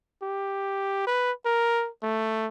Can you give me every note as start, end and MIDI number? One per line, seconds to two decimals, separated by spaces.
0.23 1.03 67
1.07 1.32 71
1.45 1.89 70
2.03 2.47 57